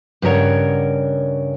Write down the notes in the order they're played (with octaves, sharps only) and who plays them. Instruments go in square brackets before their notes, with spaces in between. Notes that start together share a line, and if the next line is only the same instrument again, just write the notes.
[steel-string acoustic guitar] G2 C#3 A#4 C#5 F#5